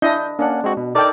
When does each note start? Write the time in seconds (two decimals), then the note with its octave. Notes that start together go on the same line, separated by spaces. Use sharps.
0.02 D4 E4 D#5 G6
0.39 A#3 C#4 D4 F#5
0.64 G#3 C4 F#4
0.77 B2
0.95 D#4 A4 A#4 D5 G5 A5